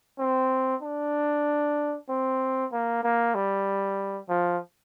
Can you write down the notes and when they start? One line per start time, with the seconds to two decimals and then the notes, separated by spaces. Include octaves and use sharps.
0.19 C4
0.82 D4
2.09 C4
2.72 A#3
3.04 A#3
3.35 G3
4.30 F3